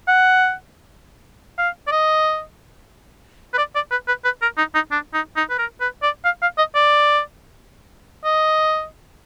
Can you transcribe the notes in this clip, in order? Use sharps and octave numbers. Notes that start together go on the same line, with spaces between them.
F#5
F5
D5
D#5
B4
D5
D5
B4
B4
B4
A#4
D#4
D#4
D4
D#4
D#4
B4
A#4
B4
D5
F5
F5
D#5
D5
D#5